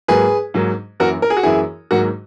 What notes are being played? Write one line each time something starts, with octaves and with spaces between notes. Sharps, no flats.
G#2 F#3 A#3 G#4 B4
G#2 F#3 A#3
F#2 E3 A#3 F#4 A#4
A#4
G#4
F#4
F#2 E3 A#3 E4 G#4
G#2 D#3 F#3 A#3 F#4